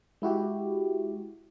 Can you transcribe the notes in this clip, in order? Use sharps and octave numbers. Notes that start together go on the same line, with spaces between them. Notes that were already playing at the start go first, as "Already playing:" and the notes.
G#3 E4 F#4 G4